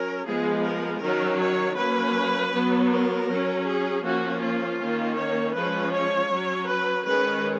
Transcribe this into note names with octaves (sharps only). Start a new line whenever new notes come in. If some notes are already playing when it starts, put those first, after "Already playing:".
Already playing: F#3 C#4 A#4
F3 G#3 B3 G#4
A#4
D#3 F#3 C#4 A#4
C#5
F#3 A#3 C#4 B4
F#3 B3
A#4
F#3 C#4
G#4
F3 A#3 C#4 F#4
F4
D#3 A#3 C#4
C#5
F3 G#3 C#4 B4
C#5
F#3 C#4
B4
D#3 G#3 C#4 B4